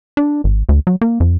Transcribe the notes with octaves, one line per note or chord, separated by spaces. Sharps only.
D4
G#1
D2
F#3
A#3
F2